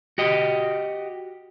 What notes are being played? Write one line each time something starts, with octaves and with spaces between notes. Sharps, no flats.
F#4 G4 D#5